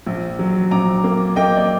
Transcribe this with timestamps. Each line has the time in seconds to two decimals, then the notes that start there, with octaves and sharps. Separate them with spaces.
0.06 A#1
0.39 F#3
0.71 A#1 A#5 D6
1.04 A#3
1.36 A#3 D#5 G5
1.57 D5